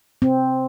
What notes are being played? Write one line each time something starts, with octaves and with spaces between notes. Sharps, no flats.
C4